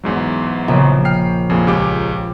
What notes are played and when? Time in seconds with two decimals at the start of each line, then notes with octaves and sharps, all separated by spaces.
0.04 E2 G#2 F#3
0.68 A#1 C#3
1.05 G5 F6 C7
1.50 F2 A#2 G#4
1.67 C#2 G4 D6